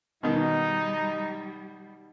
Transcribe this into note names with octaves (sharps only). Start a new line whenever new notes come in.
B2 D#3 G3 D#4